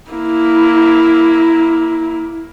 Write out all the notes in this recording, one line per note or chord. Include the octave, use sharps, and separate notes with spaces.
A#3 E4